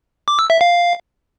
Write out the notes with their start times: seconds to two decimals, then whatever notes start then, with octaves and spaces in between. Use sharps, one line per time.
0.28 D6
0.39 E6
0.50 E5
0.61 F5